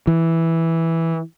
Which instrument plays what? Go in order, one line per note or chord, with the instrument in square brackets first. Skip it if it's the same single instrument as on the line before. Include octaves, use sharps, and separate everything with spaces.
[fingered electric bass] E3